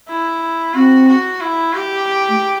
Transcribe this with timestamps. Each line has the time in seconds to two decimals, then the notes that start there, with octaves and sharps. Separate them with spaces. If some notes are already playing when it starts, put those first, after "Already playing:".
0.08 E4
0.74 C4 F#4
1.07 F#4
1.40 E4
1.74 G4
2.28 A3